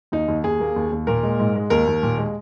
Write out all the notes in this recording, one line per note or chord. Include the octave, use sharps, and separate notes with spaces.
D#2 D#4
D#2
D#2 G#4
A#3
D#2
D#2
A#2 A#4
G#3
G#2
G#3
D#2 A#4
D#2
A#2
G#3